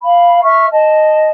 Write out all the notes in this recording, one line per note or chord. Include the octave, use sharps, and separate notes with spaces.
F5 B5
E5 C#6 F6
D#5 A5